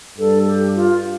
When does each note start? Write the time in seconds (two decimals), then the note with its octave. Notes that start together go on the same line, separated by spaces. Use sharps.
0.18 G2 A4
0.48 G4
0.76 F4